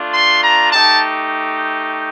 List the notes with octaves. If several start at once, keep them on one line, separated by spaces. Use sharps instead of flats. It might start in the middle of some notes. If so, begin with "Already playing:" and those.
Already playing: A3 D4 F4
C6
A#5
A3 D#4 G4 A5